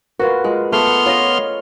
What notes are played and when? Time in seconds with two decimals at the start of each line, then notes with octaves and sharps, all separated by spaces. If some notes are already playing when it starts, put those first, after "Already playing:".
0.20 F4 F#4 A#4 B4
0.44 G#3 F4
0.73 A3 B3 C6 F6
1.06 F4 C#5 D#5